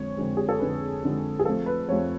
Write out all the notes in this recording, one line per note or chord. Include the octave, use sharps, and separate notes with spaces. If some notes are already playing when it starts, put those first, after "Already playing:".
Already playing: F2 D3 G#3 C#5
F2 D3 G#3
G#4
A4
F2 D3 G#3 B4
F2 D3 G#3
G#4
F2 F3 A3 A4
B4
F2 F3 A3 C#5